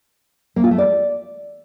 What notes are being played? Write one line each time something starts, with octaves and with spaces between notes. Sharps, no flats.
A#3
F4
A3
D5